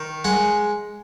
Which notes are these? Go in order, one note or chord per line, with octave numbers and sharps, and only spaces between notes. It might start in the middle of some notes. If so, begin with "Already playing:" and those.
Already playing: D#3
G#3 F#5